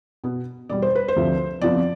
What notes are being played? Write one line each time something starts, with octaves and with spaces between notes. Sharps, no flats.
B2 B3
E2 B2 G3 D5
C5
B4
C5
D2 C3 F3 A3
F2 C3 F3 B3 D5